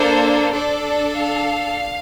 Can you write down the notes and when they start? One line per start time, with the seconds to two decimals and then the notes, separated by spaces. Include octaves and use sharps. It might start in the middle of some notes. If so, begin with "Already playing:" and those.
Already playing: A#3 D4 A4 C5
0.53 D4 A4 D5
1.16 F5